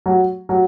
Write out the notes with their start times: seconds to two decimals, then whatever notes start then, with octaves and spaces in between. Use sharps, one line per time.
0.06 F#3
0.49 F#3